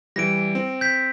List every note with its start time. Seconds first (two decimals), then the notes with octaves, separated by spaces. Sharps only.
0.16 E3 G3 A#6 D7
0.55 C4
0.81 G6 B6